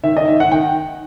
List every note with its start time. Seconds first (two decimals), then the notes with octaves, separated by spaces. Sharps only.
0.04 D#3 E5
0.17 D#5
0.28 D#3 E5
0.40 F#5
0.52 D#3 G5